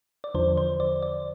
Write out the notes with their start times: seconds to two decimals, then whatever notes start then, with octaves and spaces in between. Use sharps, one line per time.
0.24 D5
0.35 E2 D3 F3 C5
0.57 C5
0.80 D5
1.03 D5